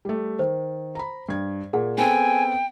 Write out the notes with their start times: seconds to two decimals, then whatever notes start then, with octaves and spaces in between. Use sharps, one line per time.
0.05 G3 A3
0.39 D#3 C5
0.95 A#5 B5
1.29 G2 G#6
1.73 A#2 G#4 F#5
1.98 B3 C4 A4 G5 G#5